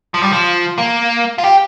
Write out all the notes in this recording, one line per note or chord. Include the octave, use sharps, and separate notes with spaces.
F3
G3
F3
A#3
F4
G4